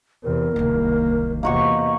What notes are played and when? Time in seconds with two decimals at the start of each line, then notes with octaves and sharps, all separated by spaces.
0.24 E2 C3 A#4
0.56 D1 C2 D#3 A#3
1.43 E2 C3 A#3 F#4 D#5 C#6